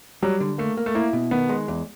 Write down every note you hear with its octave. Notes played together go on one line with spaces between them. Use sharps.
F#3 G3
D3
A3 A#3
A#3
A3
A#3 E4
B2
D#3 B3
G#3
E2